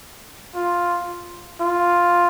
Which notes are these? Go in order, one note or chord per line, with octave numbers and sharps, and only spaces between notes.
F4
F4